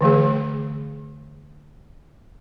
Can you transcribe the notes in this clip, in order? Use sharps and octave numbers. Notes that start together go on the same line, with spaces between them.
D3 E3 A3 G#4